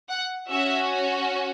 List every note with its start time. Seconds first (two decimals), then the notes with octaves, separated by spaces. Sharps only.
0.08 F#5
0.48 C#4 F#4 E5